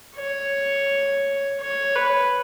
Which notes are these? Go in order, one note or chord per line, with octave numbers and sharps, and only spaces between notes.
C#5
C#5
B4